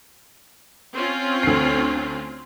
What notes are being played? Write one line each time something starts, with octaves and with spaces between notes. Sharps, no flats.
C4 C#4 F4
D2 C7